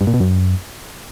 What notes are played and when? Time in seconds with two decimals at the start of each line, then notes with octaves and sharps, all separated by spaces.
0.01 G2
0.07 A#2
0.14 B2
0.20 F#2